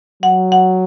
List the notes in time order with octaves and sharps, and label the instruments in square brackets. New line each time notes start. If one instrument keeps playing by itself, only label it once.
[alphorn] F#3 [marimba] F#5
[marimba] F#5